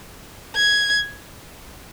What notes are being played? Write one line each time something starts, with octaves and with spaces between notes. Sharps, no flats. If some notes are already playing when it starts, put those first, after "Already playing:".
G#6